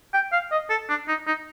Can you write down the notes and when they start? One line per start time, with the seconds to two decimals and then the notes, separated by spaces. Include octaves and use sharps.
0.14 G5
0.32 F5
0.51 D#5
0.70 A4
0.89 D4
1.08 D#4
1.27 D#4